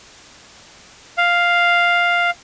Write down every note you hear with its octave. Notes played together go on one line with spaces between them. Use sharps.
F5